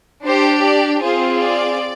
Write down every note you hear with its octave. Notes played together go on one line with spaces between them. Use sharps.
D4 G4 C5
D5
C4 F4 G#4 C5
D5